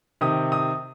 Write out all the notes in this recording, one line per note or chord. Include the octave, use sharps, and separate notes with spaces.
C3 D#3 D#6
D#6